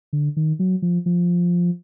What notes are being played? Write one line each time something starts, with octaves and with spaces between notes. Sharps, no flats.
D3
D#3
F#3
F3
F3